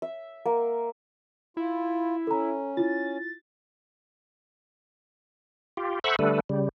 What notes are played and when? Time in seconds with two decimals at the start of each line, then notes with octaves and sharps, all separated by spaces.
0.02 E5
0.46 A#3
1.57 E4 F4
2.27 C#4 A4 A#5
2.77 E4 F4 A6
5.77 F4 G4
6.04 A4 C5 E5 F#5 B5 C#6
6.19 D3 G3 A3 A4 B4
6.49 C#3 G3